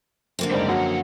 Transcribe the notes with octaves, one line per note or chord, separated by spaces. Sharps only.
D3 A#3 C4
F#1 G#2 G3 C5 D5
F#2 F3 F#3 F#5